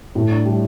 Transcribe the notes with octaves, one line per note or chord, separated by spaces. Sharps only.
A2
D4
G3